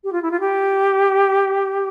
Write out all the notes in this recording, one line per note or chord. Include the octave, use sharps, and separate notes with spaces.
G4
F4
E4
F4
G4